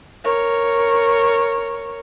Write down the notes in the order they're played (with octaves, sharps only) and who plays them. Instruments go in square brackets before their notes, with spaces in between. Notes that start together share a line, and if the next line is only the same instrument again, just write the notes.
[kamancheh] A#4 C#5